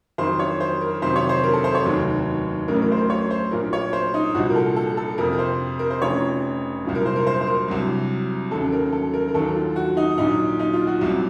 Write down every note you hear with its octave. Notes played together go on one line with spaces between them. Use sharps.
F2 D#3 F#3 C5
C#5
C5
A#4
F2 C3 D#3 F#3 C5
C#5
C5
A#4
A4
C5
C#5
F1 D#2 D#3 F#3
A1 A2 F#3 A#4
A#4
C5
A#4
C#5
C5
A#1 A#2 F#3 A#4
C#5
C5
D#4
C2 A#2 F3 F#4
A#4
A4
A4
A4
F2 C3 F3 A#4
A#4
C5
A#4
C5
F1 F2 C#3 F3 C#5
C2 A#2 F#3
A#4
C5
A#4
C5
C5
A#4
C2 C3 F#3
D#2 C#3 F#3 A4
A#4
A4
A#4
A#4
D#2 D#3 F#3 A4
F4
F#4
D#4
A#1 A#2 F#3 D#4
D#4
F4
F#4
C2 C3 F#3